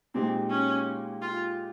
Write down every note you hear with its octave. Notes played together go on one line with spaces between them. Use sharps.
A#2 G#3 C4 D#4 G4
C#4
F4